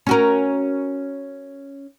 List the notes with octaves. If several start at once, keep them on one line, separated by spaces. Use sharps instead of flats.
C#4 F#4 A#4